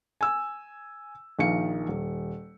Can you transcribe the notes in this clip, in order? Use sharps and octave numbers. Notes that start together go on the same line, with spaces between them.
G#5 E6
A#1 D#3 F5 C#7
D#1